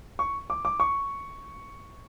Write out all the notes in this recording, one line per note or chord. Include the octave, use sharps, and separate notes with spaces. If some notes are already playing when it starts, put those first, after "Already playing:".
C#6
D6
D6
C#6